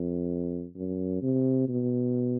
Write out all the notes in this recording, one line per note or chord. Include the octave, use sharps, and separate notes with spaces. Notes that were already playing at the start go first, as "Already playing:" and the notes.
Already playing: F2
F#2
C3
B2